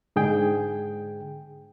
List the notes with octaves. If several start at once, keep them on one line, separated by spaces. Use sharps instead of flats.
G#2 D3 G#4 G5